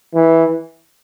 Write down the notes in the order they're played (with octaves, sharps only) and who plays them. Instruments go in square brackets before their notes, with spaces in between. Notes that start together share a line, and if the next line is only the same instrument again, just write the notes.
[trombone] E3